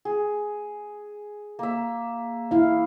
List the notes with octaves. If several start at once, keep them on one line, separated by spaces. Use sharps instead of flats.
G#4
A#3 E5
E4 F5